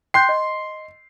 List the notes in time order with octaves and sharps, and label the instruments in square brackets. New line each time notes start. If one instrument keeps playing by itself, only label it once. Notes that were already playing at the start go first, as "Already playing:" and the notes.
[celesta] G5 F#6 G6 [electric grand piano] C6 C7
[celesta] D#5